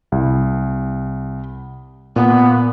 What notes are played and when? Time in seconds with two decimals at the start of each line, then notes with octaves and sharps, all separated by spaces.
0.12 C2
2.16 A#2 B3